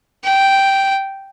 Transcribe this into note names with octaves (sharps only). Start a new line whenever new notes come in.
G5